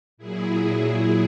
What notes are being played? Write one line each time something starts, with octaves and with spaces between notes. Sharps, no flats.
A#2 F#3 E4 G#4